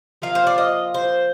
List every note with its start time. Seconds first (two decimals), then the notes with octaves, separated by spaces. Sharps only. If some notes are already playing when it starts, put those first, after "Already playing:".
0.22 F3 A#3 F4 F5
0.35 C5
0.47 D5
0.58 D#5
0.94 C5